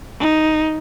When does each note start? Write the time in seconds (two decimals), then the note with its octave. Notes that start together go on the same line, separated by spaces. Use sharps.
0.20 D#4